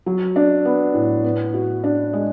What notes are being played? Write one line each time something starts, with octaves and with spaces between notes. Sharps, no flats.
F#3
D4
B3
A2
B3
F#4
D4
G#3